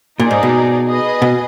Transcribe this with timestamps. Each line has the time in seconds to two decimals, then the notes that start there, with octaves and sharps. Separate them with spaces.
0.20 A#2 D#4 G#4 D5
0.31 G#2
0.43 B2
0.88 G#4 B4 D#5
1.22 B2